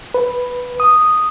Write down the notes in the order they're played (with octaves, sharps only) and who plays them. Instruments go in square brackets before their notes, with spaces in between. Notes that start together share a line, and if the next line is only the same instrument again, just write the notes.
[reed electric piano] B4
D#6